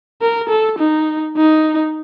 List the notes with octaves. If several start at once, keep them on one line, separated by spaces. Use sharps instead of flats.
A#4
A4
D#4
D#4